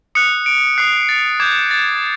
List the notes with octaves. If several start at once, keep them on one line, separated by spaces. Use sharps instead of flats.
D#6 F#6 C#7
D7
D#6 F#6 C7
A6
D6 G6 G#6
A6